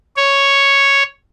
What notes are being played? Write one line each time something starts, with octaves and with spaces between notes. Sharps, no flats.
C#5